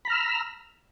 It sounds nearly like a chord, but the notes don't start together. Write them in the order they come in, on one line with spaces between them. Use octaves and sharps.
B5 A#5 F6 E6